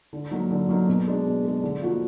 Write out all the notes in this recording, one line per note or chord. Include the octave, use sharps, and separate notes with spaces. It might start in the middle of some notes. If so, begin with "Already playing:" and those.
D3
F#3 A#3 D#4
D3
F#3 A#3 D#4
B2
G#3 D4
B2
G#3 D4
D3
F3 A#3 D#4 F#4